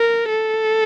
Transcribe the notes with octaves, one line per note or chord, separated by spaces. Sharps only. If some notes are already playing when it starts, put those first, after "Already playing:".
Already playing: A#4
A4